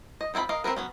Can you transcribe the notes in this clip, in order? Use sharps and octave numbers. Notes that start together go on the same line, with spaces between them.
D#5
D#3 C4 E4 F4 B5
A#4 D#5 F5
C4 G#4 A#4 B4
F#3 B3 C#4